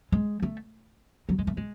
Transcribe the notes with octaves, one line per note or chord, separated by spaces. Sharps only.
G#3
A3
F#3
G#3
A3
G#3